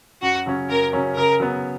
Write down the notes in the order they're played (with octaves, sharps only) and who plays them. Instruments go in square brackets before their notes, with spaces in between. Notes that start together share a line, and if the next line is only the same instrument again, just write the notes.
[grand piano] F#2 [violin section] F#4
[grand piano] C#3 F#3 C#4
[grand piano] F#2 [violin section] A#4
[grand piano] C#3 F#3 C#4
[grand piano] C#3 [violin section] A#4
[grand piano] F#3 B3